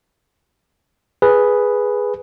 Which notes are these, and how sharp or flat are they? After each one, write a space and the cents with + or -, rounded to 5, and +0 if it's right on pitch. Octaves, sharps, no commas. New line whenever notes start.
G#4 +0 B4 +0